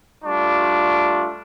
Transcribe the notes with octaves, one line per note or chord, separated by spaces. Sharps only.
G3 A3 D4 F4 C#6